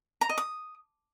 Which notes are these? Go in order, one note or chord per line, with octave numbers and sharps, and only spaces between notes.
A#5
D#5
D#6